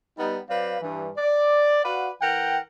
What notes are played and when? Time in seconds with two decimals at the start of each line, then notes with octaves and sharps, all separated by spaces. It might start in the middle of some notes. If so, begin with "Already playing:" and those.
0.18 G3 B3 D#4
0.48 F#3 C4 B4 D5 F5
0.81 G2 E3
1.17 D5
1.84 F#4 B4 D5 F5 F#5
2.21 E3 A#4 F#5 G5